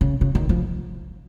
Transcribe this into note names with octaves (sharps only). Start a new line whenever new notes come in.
C#3
C#3
D#3
F3